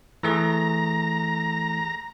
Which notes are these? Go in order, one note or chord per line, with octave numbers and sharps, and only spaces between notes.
E3 A3 G#4 A#5